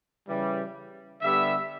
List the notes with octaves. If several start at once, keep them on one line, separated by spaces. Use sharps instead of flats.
C#3 E3 G3
D3 G3 B3 E5